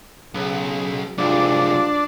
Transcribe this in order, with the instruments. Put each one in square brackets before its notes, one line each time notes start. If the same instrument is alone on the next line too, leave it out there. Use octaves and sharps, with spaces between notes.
[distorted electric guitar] B1 [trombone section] C#3
[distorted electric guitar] C2 G#2 [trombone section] F3 F#3 F4 [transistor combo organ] D4